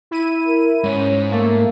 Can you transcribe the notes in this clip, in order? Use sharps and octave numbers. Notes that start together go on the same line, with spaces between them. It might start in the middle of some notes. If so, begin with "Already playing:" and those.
E4 D#7
A#4
G#2 C#4
A3 A#3